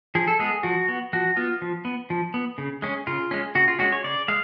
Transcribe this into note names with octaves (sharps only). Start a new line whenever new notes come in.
F3 G#4
A4
G#3 B3 G#4
F3 F#4
B3
F3 F#4
B3 F4
F3
B3
F3
B3
C#3
G#3 C#4
C#3 F4
G#3 C#4
C#3 F#4
F4
G#3 C#4 F#4
C#5
C#3 D5
G#3 F5